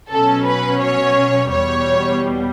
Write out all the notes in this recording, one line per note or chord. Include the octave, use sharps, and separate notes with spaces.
B2 F#3 C#4 A4
B4
C#5
E2 B2 G3 C#5